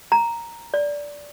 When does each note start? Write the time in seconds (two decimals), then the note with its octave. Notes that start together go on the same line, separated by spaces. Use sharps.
0.12 A#5
0.74 D5